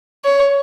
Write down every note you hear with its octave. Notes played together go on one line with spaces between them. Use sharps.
C#5